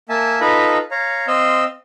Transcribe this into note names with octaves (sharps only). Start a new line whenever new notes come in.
A#3 E5 G#5 A5
D#4 F4 A4 B4 A#5 B5
C#5 F5 A#5
C4 D#5 F5 C6 E6